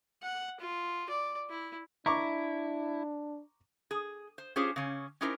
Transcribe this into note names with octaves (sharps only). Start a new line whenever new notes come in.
F#5
F4
D5
E4
D4 E4 A#5 C#6 D6
G#4
C5
C#4 F4 G4 G#4 C5 C#5
C#3 C#4
C#4 D#4 E4 G4 A#4 C5